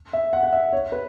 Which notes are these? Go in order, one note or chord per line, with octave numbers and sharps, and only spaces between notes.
E5
F#5
F#5
E5
C#5
B4